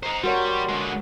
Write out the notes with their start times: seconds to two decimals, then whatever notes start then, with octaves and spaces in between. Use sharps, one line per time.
0.03 C5 D#5 A#5
0.24 G3 F#4 A#4 C#5 C6
0.69 D3 G#3